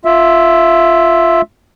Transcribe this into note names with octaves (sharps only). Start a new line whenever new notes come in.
F4 E5